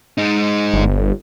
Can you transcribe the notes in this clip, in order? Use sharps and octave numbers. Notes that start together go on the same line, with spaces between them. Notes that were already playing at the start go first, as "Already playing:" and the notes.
G#3 D#4
G1